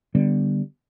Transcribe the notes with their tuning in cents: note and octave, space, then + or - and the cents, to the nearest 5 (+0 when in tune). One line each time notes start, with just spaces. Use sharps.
D3 +0 G3 +0 B3 -5